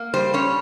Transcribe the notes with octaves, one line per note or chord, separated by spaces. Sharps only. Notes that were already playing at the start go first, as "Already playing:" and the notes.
Already playing: A#3
G3 C5
C#4 C#5